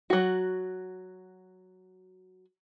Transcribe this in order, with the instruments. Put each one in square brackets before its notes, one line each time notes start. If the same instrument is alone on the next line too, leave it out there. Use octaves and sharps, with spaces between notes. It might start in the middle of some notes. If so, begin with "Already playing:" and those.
[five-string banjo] F#3 F#4